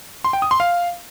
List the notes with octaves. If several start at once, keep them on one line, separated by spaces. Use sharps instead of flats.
C6
G5
D#6
C6
F5